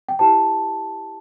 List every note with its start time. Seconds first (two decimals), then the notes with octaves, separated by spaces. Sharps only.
0.09 G5
0.19 E4 G4 C5 A5